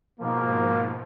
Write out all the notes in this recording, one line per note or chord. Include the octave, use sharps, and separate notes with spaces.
G#2 B2 F3 A#3